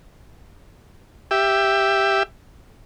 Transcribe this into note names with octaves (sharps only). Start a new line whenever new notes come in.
G4 E5